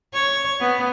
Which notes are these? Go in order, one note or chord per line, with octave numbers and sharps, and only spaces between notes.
C#5
B3